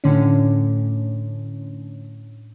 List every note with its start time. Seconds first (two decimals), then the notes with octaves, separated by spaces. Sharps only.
0.04 A2 D3 C#4